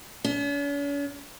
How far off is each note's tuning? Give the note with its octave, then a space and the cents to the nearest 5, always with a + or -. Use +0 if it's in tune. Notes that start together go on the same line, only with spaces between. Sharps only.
C#4 +45